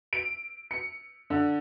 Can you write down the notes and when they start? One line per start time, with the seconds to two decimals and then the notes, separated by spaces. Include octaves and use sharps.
0.13 D7
0.71 C#7
1.30 D3